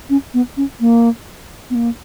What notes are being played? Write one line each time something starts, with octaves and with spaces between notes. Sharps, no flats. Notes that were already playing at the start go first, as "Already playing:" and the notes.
C#4
B3
C#4
A#3
B3
A#3